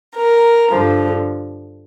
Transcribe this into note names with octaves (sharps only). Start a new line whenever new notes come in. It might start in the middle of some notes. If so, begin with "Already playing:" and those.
A#4
G2 D3 F3